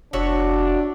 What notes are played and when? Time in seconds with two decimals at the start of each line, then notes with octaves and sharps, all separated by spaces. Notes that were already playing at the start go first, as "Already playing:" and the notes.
0.13 F1 D4 F#4 C#5 E5